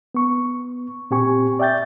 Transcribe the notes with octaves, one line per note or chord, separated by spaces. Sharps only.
B3 C#6
A#2 C4 G4 G#5 C#6
D5 E5 G5 G6 A6